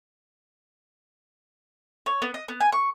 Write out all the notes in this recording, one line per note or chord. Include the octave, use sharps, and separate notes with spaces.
C#5
B3
D#5
B3
G#5
C#6